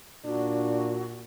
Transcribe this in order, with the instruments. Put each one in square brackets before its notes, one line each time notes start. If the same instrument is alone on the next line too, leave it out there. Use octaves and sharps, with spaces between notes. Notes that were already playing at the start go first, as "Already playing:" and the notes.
[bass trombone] A#2 [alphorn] D4 [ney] F#4